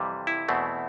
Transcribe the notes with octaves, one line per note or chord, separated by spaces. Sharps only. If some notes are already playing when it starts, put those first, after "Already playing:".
Already playing: F2 C3 E3 G3
E4
E2 B2 A3 C4